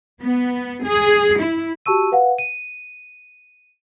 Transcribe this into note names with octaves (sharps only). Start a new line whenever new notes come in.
B3
G#4
E4
F#4 G4 A5 C#6 E6 D#7
B4 F5 F#5
D#7